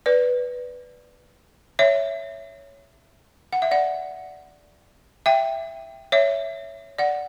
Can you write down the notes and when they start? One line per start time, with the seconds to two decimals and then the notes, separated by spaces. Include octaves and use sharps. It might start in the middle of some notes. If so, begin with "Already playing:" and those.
0.06 B4 D5
1.79 C#5 E5
3.53 F#5
3.62 E5
3.71 D5 F#5
5.26 E5 G5
6.12 C#5 E5
6.98 D5 F#5